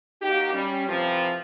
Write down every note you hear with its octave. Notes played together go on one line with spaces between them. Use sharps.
A#3 D#4 F#4 G4
G3 C#4
A2 C3 E3 F3